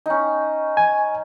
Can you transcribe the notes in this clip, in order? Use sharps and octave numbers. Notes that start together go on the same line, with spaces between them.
C#4 D#4
G#5